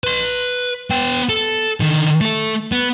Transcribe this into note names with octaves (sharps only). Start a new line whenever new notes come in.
B4 C6
B3 G5
A4
D3 D#3
A3 A4
B3